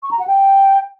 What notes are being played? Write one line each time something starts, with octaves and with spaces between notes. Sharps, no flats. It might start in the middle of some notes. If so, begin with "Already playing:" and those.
C#6
A#5
F#5
G5